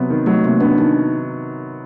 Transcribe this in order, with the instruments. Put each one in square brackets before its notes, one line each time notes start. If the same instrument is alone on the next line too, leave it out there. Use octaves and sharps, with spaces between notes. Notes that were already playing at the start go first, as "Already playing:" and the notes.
Already playing: [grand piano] C3 F#3 B3
D#3
[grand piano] F#3 [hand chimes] A3
[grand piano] C3 [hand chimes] A#3
[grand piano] B3 [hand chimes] D4
[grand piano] D#3 [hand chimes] D#4